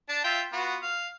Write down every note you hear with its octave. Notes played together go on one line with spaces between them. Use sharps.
D4 A5
F4 E5 G5
B3 F4 F#4
F5